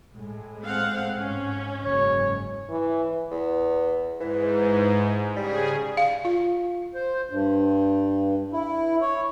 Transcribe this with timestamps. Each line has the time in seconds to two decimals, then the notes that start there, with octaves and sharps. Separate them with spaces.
0.13 A2 G#3
0.62 C4 F5 F#5
1.19 G#2 C#4
1.84 F#1 G#2 C#5
2.70 E3
3.31 E2
4.20 G#2 E3
5.36 C#3 G3 G#4
5.97 F5
6.25 F4
6.93 C5
7.30 G2
8.53 E4
9.01 C#5